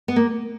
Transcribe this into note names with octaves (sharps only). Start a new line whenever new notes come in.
B3
A#3